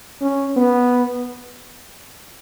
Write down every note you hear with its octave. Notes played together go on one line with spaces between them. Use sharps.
C#4
B3